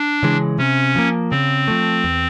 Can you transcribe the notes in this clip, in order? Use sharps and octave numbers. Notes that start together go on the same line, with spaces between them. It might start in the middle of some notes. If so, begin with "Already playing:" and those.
Already playing: D4
C#3 E3 G#3
C3 C#4
F3 A#3
C#3 C4
F3 A3
E2